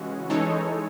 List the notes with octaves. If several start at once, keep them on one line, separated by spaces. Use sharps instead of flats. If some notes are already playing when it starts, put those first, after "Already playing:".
Already playing: C#3 E3 G#3 C#4 F#4
E3 G#3 D#4 A4 C#5